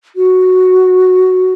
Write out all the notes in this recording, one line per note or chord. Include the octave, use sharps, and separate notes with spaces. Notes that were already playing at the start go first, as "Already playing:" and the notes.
F#4